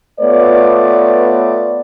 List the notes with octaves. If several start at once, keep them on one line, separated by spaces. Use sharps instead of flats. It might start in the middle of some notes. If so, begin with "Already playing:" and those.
A3 B3 F4 B4 C#5 D5